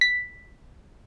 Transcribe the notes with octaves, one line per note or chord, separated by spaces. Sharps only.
B6